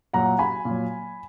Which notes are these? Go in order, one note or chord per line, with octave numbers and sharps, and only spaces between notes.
A#2 F#3 F#5 A#5
G#5 B5
A#2 F#3